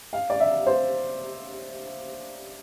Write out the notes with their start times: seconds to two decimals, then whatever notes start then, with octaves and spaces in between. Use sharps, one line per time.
0.13 F5
0.30 D5
0.40 E5
0.66 C5